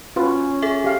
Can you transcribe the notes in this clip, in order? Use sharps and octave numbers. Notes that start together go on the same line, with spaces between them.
C#4 F4 F#4 B4
G#4 A4 E5
G4 F5